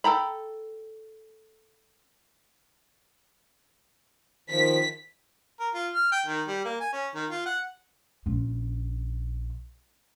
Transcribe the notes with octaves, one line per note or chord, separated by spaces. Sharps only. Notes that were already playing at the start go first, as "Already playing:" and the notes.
A4 G5 A#5 B5
D#3 F3 B6
A#4
F4
F6
G5
D#3
G3
A#3
G#5
C#4
D#3
F4
F#5
A#1 C#4